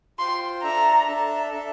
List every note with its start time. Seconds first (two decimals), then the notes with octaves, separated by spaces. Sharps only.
0.19 F4 C5 G5 C6
0.63 D4 A4 E5 A5 A#5
1.07 D4 A4 E5 A5
1.50 D4 A4 E5 A5